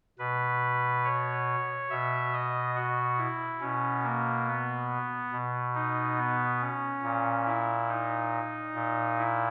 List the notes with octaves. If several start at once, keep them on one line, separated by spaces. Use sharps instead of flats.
B2 B4
C#5
B2 E5
D#5
F#4
E4
B2 C#4
A#3
B3
B2
D#4
B3
C#4
A#2
E4
D#4
A#2
E4